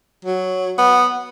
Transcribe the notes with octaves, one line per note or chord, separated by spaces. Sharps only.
F#3
B3